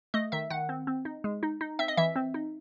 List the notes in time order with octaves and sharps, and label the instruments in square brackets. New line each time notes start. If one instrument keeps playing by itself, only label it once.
[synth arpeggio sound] A3 D#5
D#3 E5
D#3 F#5
C4
C4
D#4
G#3
D#4
D#4
C4 E5
D#5
E3 E5
C4
D#4